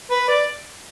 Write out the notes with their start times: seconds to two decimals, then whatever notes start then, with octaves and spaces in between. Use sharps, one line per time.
0.11 B4
0.28 D5